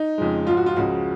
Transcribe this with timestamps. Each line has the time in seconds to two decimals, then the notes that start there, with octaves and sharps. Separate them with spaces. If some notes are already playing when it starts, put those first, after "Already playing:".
Already playing: D#4
0.18 F2 C#3 F3 G#3
0.47 G#2 F3 G#3 F4
0.57 F#4
0.66 F4
0.76 C#2 C#3 F3 F#4